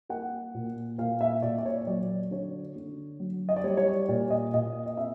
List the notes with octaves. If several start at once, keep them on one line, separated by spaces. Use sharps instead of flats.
A#3 F#5
A#2
A#2 F5
E5
A#2 D5
D5
C#5
F#3 D5
D3 C#5
D3
F#3
D#5
D5
G3 C#5
C#5
D5
A#2 D5
D#5
A#2 D#5
D#5
C4 E5